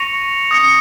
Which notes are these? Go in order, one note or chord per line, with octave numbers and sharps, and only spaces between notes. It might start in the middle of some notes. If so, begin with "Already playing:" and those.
Already playing: C#6 A#6 C#7 F7
D#6 A#6 C#7